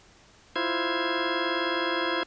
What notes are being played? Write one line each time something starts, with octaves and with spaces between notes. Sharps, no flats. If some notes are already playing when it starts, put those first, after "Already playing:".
E4 F4 C5 G#6